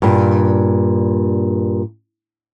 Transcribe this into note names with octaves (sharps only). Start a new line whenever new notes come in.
G2 A#2